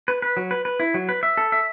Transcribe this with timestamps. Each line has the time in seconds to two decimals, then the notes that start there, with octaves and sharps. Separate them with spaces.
0.08 B4
0.22 B4
0.37 F#3
0.51 B4
0.65 B4
0.80 E4
0.94 F#3
1.09 B4
1.23 E5
1.37 A4
1.52 E5